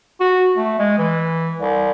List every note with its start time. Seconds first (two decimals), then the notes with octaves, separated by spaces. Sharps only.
0.20 F#4
0.57 A3
0.79 G#3
0.98 E3
1.60 C2